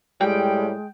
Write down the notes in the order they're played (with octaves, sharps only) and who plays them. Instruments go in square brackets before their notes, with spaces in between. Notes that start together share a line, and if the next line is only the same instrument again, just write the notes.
[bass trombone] A2 [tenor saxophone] G3 [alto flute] G#3 [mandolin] G5